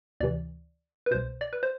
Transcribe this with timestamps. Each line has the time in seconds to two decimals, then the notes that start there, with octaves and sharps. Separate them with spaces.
0.20 D2 C3 E3 D5
1.06 B4
1.11 C2 B2 C5
1.41 D5
1.53 B4
1.63 C5